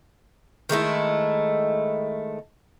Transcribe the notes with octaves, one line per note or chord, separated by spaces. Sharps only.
D#3 G#3 A3 E4